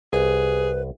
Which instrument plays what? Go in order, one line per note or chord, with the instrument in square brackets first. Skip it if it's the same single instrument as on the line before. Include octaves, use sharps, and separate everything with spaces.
[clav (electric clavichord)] C2 [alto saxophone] G#4 [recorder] B4